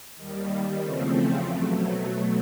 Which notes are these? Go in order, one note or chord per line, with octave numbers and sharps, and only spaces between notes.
D#2 D#3 G3
E2 C#3 F3 A3 C4
B2 F#3 A3